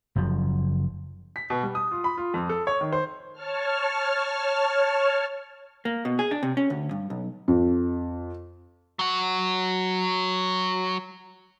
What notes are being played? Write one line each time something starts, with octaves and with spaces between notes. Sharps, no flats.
F#1 F#2 F3
B6
B2
G3
D#6
F4
B5
F4
F2
A4
C#5
D#3
C5
C#5 A5 F6
A#3
B2
G#4
D4
C3
C#4
D2
G2
B1
F2
F#3 F#4